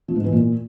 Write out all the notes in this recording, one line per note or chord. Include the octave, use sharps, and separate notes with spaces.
F3
G#2
E3
A#2